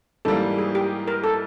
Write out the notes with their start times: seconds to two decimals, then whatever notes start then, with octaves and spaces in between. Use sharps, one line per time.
0.25 G#2 E3 G3 A#3 A4
0.58 G#4
0.75 G4
1.08 A#4
1.24 A4